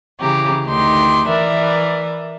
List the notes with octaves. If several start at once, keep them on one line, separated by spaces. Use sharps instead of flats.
C#3 E3 G4 A#5
D2 D#3 D#4 G4 C6
E3 A#4 B4 D5 E5